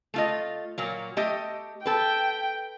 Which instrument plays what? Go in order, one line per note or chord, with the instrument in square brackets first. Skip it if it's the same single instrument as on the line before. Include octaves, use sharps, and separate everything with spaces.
[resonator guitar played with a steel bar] A3 F4 D#5
A#2 F#3 A#3
A3 G4 D#5
[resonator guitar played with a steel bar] A4 B4 [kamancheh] G5